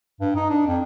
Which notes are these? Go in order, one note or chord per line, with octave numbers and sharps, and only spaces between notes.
G2
D#4
D4
F2